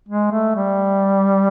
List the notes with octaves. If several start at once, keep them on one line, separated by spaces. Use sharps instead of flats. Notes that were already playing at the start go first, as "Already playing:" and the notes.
G#3
A3
G3